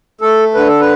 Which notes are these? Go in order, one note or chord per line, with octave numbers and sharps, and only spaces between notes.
A3 A4
D3 B4
A4
B4